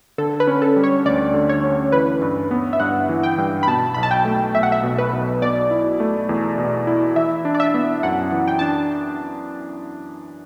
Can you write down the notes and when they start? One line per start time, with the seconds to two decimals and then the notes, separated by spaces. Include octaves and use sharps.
0.18 D3 A4
0.40 B4
0.47 C#4
0.62 A4
0.76 G3
0.83 C#5
1.05 D2 D5
1.34 D3
1.49 C#5
1.63 C#4
1.92 E3 B4
2.22 G2
2.51 B3
2.73 E5
2.80 G2 F#5
3.09 E3
3.23 G5
3.38 G2
3.63 B5
3.67 B2 A5
3.94 B1 B5
4.03 A5
4.11 G5
4.25 A3
4.54 B1 E5
4.63 F#5
4.72 E5
4.83 B2
4.98 B4
5.13 B1
5.42 B2 D5
5.71 E4
6.00 A3
6.29 E2
6.58 B2
6.87 E4
7.16 E3 E5
7.45 D4
7.54 D5
7.60 E5
7.74 B3
8.03 F#2 F#5
8.32 E3
8.48 G5
8.59 D4 A5